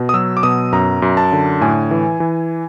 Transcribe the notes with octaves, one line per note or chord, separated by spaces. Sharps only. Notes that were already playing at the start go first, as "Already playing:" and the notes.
Already playing: B2
D#6
F#3 E6
D6
B2 D#6
F#2 A#5
F#2
A5
D3
A2 G#5
E3
E3